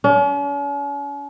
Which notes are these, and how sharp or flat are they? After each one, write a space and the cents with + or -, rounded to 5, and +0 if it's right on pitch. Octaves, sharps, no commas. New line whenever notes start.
C#4 +45